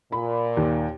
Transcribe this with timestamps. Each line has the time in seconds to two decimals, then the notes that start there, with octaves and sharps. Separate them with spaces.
0.12 A#2 B5
0.57 D#2